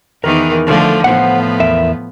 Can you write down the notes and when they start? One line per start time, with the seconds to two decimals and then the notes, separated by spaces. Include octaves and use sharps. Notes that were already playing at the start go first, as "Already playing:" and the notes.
0.24 E2 D#3 E3 A#4
0.66 D3 F3 A3
1.04 A2 F3 B3 C5 F#5
1.60 E2 A#4 E5